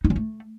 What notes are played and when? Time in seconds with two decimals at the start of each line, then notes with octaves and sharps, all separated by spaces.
0.04 D#4
0.10 C#4
0.16 A3